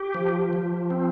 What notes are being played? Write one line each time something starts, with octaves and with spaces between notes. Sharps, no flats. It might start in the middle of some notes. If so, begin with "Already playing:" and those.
Already playing: G4
F3
F3
C4